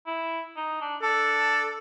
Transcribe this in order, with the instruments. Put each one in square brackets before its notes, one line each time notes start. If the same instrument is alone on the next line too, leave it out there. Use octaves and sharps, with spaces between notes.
[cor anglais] E4
D#4
D4
[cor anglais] D4 [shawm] A4